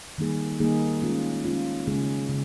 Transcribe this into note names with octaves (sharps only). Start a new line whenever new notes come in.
D#3 G3 A#3 D#4 G#4
D#3 G3 A#3 D#4 G#4
G#3 C#4 F4
G#3 C#4 F4
C#3 G#3 C#4 G#4
C#3